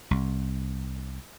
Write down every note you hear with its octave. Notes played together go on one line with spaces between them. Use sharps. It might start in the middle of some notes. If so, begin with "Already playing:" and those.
C2